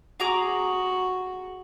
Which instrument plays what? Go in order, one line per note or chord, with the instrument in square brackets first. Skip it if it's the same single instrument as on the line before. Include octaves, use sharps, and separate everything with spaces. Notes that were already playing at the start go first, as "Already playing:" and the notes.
[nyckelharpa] F#4 [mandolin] G#4 A#5 D6